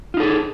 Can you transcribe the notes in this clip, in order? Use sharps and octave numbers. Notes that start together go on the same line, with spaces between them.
D#4 F4 G#4 A4